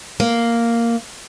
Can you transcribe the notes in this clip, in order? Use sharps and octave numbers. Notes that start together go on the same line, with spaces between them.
A#3